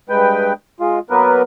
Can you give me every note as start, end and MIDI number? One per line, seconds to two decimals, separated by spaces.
0.09 0.53 43
0.09 0.53 56
0.09 0.53 71
0.09 0.53 79
0.80 0.99 56
0.80 0.99 65
1.10 1.42 54
1.10 1.42 58
1.10 1.42 59
1.10 1.42 70
1.10 1.42 71